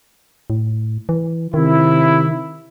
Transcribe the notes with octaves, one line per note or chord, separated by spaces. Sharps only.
A2
E3
C3 D#3 E4